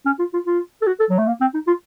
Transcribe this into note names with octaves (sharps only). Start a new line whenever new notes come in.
C#4
F4
F4
F4
A4
F#4
A4
F#3
A3
A#3
C4
D#4
F4